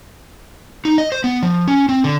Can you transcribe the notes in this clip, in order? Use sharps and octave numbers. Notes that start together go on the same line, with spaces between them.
D#4
D#5
C5
B3
F3
C#4
C4
D3